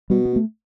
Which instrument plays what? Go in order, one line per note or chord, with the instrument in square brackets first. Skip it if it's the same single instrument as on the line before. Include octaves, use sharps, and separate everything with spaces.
[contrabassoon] B2 [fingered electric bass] G3
[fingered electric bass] B3
A3